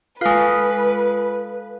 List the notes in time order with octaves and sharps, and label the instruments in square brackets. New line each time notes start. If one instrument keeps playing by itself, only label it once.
[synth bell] G#3 F4 [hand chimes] A4 F5 F#6 [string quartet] B4